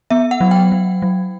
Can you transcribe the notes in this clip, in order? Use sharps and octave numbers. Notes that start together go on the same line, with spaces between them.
B3 E5
F#5
F#3
G5
F#3
F#3